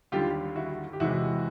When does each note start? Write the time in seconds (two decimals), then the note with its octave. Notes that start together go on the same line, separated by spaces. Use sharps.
0.12 D#2 D3 G3 F4 G4
0.56 E4 F#4
0.93 G4
1.00 E2 C3 E3 G#3 E4 F#4